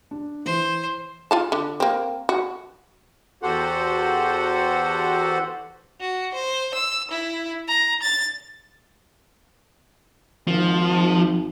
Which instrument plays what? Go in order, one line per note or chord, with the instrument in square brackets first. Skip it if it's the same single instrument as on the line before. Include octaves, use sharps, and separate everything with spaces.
[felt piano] D4
[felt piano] E3 [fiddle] C5
[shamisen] F4 F5 A5
D3
A#3 C4
F#4
[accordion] E2 F#4 G4 A4 C5 F#5
[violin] F#4
C5
E6
E4
A#5
A6
[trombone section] G#1 [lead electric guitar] F3